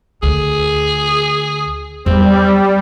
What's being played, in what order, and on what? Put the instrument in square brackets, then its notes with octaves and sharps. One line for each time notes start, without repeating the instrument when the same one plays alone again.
[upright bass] D2 [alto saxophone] G#4
[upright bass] E2 F#3 [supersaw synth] G3 [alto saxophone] C4